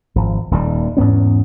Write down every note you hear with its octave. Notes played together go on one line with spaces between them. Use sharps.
G#1 F3
D#1 D#2 G3
E2 G#2 B3 C#4